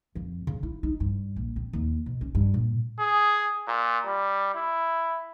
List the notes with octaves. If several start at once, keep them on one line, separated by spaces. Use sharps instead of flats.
F2
C#3
E4
D#4
G2
A#1
C4
D#2
B2
C#4
G2
A#2
G#4
A#2
G3
E4